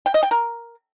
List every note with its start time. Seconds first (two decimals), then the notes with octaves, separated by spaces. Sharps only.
0.06 G5
0.14 D#5
0.23 G5
0.31 A#4